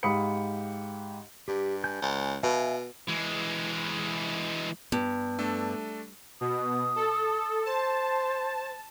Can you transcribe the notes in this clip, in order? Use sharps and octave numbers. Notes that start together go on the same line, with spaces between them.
G#2 G4 F5 B5 D#6 C#7
G2 G4
G#5 G6
C#2
B2 E5 F5 G#5
E3 G#3
G2 B3
A3 D4 A4
B2 D#6
A4
C5 A5